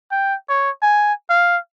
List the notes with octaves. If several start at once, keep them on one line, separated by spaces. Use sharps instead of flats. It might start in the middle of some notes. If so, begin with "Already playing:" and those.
G5
C#5
G#5
F5